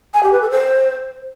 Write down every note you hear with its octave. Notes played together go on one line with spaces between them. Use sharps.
G#5
G4
B4
A4
C5